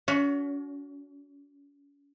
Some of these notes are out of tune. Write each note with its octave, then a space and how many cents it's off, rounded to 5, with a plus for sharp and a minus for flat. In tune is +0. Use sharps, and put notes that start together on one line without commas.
C#4 +40 F#4 +0